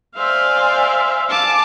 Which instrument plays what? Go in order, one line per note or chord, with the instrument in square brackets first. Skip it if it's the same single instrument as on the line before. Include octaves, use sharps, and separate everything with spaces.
[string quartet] C5 D5 G#5 [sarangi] E5 [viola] F5
[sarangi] E5
[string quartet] F5 G#5 [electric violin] A5 D6